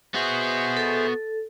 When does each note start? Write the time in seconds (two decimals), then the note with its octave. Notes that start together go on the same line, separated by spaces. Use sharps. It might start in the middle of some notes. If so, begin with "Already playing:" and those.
0.14 B3 F#4 G#4 C5 E5
0.77 A4